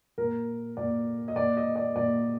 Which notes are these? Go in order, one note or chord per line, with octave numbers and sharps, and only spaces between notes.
A#2 A#4
A#2 D5
D#5
A#2 D5
D#5
D5
A#2 D5